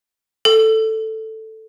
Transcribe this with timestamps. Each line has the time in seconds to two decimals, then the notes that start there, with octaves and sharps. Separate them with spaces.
0.45 A4